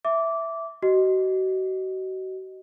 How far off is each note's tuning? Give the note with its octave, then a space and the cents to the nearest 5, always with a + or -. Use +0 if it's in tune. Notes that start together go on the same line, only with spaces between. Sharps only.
E5 +0 D6 -15
F#4 +35 D#5 +0